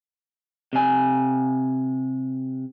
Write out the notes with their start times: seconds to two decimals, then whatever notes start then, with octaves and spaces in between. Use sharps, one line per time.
0.73 C3 G#5